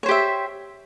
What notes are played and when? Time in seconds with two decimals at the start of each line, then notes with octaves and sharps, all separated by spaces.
0.03 C#5
0.06 C5
0.08 G4
0.11 E5